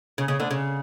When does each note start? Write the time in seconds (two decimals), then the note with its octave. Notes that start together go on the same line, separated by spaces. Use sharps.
0.18 C#3
0.28 C#3
0.39 D2 D3
0.51 C#3